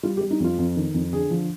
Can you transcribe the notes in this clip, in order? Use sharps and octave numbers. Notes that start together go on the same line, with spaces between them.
G3 F4
G4
G3
D#4
F2 F4
F2
D#3
F2
D3 G#4
F3